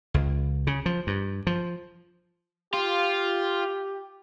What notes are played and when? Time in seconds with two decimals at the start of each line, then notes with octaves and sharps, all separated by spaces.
0.14 C#2
0.67 C#3
0.86 F3
1.07 G2
1.47 F3
2.73 F4 G4